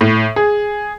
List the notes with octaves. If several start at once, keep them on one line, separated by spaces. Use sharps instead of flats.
A2
G#4